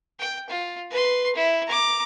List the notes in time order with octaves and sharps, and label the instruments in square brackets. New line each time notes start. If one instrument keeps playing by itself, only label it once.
[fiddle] G5
F4
B4 C6
E4
A#5 D6